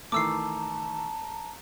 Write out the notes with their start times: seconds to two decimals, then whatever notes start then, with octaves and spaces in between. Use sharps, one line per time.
0.12 D#3 E3 A3 A5 A#5 D6 E6 C7